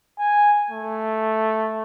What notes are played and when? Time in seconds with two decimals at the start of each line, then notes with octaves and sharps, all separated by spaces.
0.19 G#5
0.71 A3